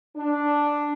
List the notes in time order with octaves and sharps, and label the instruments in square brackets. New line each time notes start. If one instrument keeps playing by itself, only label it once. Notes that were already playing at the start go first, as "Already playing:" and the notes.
[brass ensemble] D4